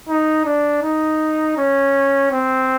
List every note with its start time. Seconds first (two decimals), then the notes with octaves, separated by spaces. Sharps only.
0.09 D#4
0.45 D4
0.82 D#4
1.57 C#4
2.32 C4